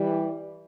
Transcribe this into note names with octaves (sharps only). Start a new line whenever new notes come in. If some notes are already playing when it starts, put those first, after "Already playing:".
Already playing: E3 G3